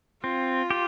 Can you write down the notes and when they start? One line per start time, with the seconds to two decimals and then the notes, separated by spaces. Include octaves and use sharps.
0.23 C4 F4
0.70 G4